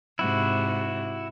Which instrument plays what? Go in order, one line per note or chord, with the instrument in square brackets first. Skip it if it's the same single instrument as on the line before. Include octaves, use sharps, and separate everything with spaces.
[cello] G#2 C3 [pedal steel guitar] E4 F#4